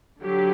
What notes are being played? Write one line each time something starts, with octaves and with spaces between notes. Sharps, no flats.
D3 F#3 G4